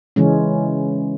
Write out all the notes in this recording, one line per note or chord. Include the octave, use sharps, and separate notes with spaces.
C#3 E3 G#3 C#4